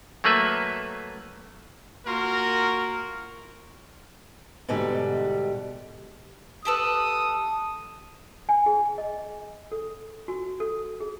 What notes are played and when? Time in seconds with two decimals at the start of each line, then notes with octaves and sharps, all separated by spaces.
0.24 F#3 A3 A#3 B4 E5
2.06 A#3 F4 F#4 A#4
4.68 G#2 B2 D3 G3
6.65 G4 A4 B4 D#6
8.49 G#5
8.66 G#4
8.98 D#5
9.72 A4
10.28 F#4
10.60 A4
11.00 G#4